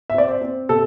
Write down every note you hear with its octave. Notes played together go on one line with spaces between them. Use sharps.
E5
C4 D5
C5
C4
C3 A4